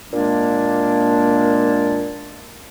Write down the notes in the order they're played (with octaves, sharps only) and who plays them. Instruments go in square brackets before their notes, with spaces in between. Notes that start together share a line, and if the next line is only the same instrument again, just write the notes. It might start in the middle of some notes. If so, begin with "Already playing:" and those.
[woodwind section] A#2 G#3 A#3 D4